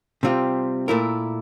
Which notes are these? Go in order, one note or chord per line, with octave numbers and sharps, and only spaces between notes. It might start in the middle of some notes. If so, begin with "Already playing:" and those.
C3 G3 C4 F4
A#2 A3 E4 A#4